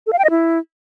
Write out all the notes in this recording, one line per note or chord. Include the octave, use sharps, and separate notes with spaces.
A4
F5
G5
D#5
E4